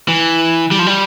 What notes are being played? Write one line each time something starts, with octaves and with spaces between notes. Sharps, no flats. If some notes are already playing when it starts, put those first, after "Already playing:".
E3
G3
F3
G3